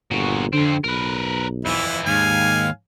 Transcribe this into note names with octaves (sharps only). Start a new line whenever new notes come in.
G1 A#2 F#4
F2 D3 C4
B1 A#4 B4
F2 E3 E4
D#2 G#2 F5 G#5